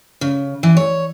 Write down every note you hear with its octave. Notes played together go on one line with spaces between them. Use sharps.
C#3
E3
C#5